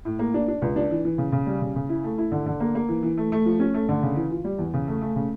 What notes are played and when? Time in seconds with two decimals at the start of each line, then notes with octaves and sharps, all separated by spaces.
0.05 A2
0.19 A#3
0.34 D4
0.48 D4
0.62 C#2
0.76 D4
0.91 E3
1.05 E3
1.18 C#3
1.32 C#3
1.47 G3
1.61 C#3
1.76 C#3
1.89 E4
2.04 A3
2.18 E4
2.32 D3
2.46 D3
2.60 A#3
2.75 A#3
2.89 E3
3.03 E3
3.17 A3
3.32 A3
3.45 F3
3.59 C#4
3.74 A3
3.89 D3
4.03 C#3
4.16 E3
4.31 F4
4.44 G3
4.59 E2
4.74 C#3
4.87 A3
5.02 A3
5.16 C#3